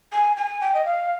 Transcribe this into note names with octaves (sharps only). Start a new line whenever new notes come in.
G#5
G#5
G5
D#5
F5